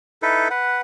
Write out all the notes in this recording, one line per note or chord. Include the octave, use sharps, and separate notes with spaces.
D#4 E4 A4 B4
B4 F#5